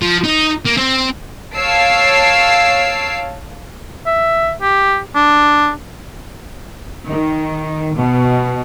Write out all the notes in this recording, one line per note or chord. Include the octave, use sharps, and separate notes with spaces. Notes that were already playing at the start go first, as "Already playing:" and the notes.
F3
D#4
A#3
C4
C#5 F5 A5 E6 C7 D7
E5
G4
D4
D#3
B2